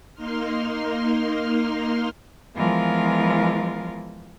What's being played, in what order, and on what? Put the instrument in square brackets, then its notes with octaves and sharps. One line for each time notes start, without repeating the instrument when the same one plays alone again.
[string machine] A#3 D#4 C6 F6
[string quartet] E3 F3 G#3 B3 F4 A#4